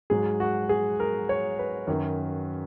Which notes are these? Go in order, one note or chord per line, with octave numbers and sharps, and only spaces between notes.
G#2 F#3 G#4
F#4
G#4
A#4
C#5
B4
F#2 D#3 F#3